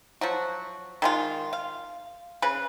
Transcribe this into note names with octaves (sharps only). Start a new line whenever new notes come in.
F3 F#3 F#4
D#3 G#3 F4
F5
C#3 B4